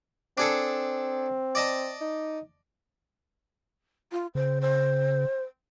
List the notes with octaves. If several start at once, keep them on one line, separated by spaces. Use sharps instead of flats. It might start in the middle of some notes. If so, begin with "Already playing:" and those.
C4 D4 G#4 A4
D5 D#5 A5
D#4
F4
C#3 C5
C5